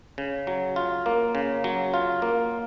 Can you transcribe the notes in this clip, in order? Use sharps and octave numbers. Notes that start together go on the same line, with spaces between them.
C#3
F#3
F4
A#3
C#3
F#3
F4
A#3